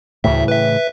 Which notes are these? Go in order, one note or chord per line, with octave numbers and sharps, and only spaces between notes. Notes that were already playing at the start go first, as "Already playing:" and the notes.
D2 A2 C#3 E3 E5
B4 E5